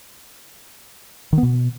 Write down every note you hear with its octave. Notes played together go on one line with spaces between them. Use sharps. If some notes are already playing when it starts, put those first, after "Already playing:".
D#3
B3
B2